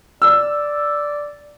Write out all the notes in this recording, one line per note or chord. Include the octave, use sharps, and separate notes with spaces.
D5 E6